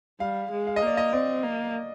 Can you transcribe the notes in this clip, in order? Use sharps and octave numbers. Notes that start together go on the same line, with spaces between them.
G3 F5
G#3
F5
D#5
A#3 D5
D#5
C4 D5
A#3